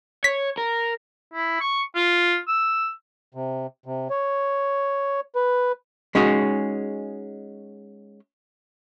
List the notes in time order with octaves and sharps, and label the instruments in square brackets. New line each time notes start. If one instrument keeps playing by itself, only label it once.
[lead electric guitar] C#5 [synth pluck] B6
[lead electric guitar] A#4
[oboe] E4
C#6
F4
E6
[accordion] C3
C3
C#5
B4
[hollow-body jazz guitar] G#3 C#4 D#4 F#4 G#4